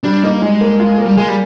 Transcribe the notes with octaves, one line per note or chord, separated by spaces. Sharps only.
G3 D4
A#3 D#4
G#3 D#4
A#3
F4
A#3
G3
G#3 G#4
G3